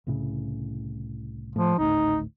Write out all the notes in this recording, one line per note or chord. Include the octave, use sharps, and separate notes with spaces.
C2 A2 C#3
A2 F3
G#1 D2 A2 D#4